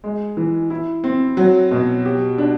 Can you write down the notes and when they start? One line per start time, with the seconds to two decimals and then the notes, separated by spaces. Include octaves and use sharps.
0.04 G#3
0.37 E3
0.70 E4
1.04 C4
1.37 F#3
1.71 B2
2.05 G4
2.38 D4